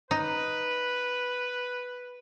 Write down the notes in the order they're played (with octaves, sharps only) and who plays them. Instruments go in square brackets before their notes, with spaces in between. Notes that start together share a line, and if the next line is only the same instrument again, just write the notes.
[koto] D#4 [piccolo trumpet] B4